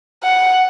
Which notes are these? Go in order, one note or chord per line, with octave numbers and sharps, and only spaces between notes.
F#5